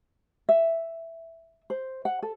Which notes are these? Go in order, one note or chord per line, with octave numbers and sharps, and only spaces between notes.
E5
C5
F#5
A4